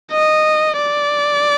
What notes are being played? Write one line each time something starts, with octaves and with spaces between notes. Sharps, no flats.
D#5
D5